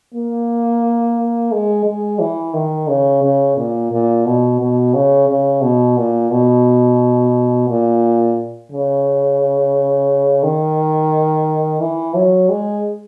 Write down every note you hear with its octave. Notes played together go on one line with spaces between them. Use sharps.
A#3
G#3
G#3
E3
D#3
C#3
C#3
A#2
A#2
B2
B2
C#3
C#3
B2
A#2
B2
A#2
C#3
D#3
E3
F#3
G#3